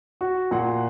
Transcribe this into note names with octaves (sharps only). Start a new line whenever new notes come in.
F#4
A#2 F#5 C6